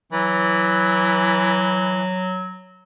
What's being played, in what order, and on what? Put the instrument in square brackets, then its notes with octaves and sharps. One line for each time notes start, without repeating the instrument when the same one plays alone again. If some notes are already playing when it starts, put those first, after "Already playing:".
[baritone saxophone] E3 [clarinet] F#3